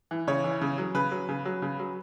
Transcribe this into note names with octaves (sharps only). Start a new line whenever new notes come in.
E3
C#3 C#5
E3
C#3
F#3
C#3 B4
F#3
C#3
F#3
C#3
F#3